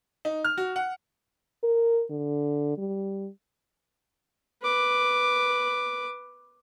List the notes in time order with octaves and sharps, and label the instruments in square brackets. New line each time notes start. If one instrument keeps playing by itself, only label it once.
[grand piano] D#4
F6
F#4
F#5
[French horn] A#4
D3
G3
[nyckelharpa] B4 D6